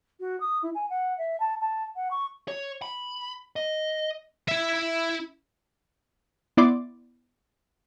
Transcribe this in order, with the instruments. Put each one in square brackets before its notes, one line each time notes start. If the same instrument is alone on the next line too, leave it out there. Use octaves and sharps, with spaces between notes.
[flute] F#4
D#6
E4
G#5
F#5
E5
A5
A5
F#5
C#6
[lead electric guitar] C#5
B5
D#5
[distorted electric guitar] E4 E5
[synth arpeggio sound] B3 E4 D5 C6 D6